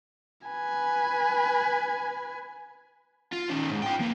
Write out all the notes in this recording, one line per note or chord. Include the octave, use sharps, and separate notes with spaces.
B4 G#5
F4
D#3 C#4
G#2
F4 G5
A#3 B3